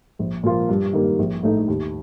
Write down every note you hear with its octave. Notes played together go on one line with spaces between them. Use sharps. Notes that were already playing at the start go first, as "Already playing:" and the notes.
A#1
A#2 F3 A#3 F4
G2
D#3 G3 A#3
A#1
A2 A3 D#4
D#2